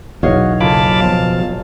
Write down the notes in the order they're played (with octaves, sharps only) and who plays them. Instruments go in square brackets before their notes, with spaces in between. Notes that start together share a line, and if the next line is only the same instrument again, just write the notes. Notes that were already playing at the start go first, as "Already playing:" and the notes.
[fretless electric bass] B1 E2 [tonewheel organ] F#4 [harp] C#5 D#5 F5
[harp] F#1 [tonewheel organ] F4 B5 D6 [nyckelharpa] F5 A5
[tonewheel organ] B2 F3